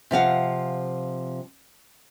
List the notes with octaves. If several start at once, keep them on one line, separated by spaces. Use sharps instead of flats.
C3 F3 F5 F#5